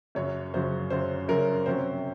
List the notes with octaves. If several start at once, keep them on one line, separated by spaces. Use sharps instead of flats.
F#2 C#3 F#3 C#4 C#5
F#2 C#3 F#3 C#4 C5
F#2 C#3 F#3 C#4 C5
F#2 C#3 F#3 C#4 A#4
C3 F#3 C#4 C5